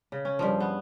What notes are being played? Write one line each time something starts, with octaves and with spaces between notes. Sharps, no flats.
C#3
C#4
G2 F3
B3